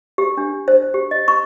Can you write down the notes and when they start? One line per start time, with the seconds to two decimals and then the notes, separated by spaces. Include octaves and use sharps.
0.18 G4
0.37 D4
0.68 C5
0.94 G4
1.11 D#5
1.28 C#6